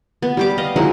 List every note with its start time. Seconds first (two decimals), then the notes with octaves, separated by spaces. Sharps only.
0.22 B3
0.37 G3 G4 D6
0.58 D#5 F5
0.76 F#3 G#3 D#4 E4